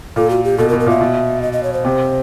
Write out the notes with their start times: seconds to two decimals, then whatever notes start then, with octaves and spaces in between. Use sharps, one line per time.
0.16 A#2 A4
0.30 F#4
0.44 G4
0.58 B2 A4
0.69 A#4
0.73 B2
0.80 A#4
0.86 A#2 E5
1.01 B2
1.42 D#5
1.53 D#5
1.63 C#5
1.73 C5
1.85 C3